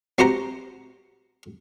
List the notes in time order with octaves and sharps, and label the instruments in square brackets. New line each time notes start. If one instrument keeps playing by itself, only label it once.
[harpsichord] C4 F#4 G4 C5 F#5 A#5